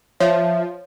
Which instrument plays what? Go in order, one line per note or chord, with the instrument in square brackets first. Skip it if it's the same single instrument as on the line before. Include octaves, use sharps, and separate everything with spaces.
[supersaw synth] F3 [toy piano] C#5 [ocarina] E5